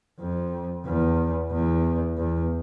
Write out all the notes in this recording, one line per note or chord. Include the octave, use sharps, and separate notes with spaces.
F2
E2
E2
E2